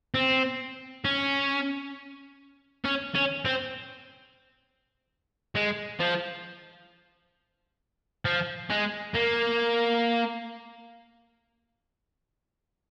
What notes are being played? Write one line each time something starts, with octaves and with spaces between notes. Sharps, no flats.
C4
C#4
C#4
C#4
C4
G#3
F3
F3
G#3
A#3